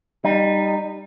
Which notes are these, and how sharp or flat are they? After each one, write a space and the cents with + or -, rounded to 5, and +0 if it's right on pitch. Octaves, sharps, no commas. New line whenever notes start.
G3 +0 D#4 -20